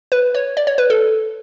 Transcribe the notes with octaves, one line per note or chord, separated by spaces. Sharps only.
B4
C#5
D5
C#5
B4
A4